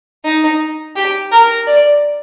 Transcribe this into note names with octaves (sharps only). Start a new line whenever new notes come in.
D#4
G4
A#4
D5